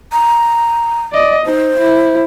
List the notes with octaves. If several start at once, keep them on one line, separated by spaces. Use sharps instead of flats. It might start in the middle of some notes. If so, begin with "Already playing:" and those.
A#5
D5 D#5
D#4 C5
E4